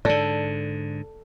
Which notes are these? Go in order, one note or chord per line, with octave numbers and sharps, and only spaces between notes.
G#2 D3 A4 D5